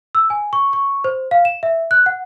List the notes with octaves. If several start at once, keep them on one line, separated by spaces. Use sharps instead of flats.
E6
G#5
C#6
C#6
C5
F5
E7
E5
F#6
F#5